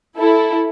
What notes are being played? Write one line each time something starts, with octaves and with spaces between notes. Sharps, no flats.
E4 A4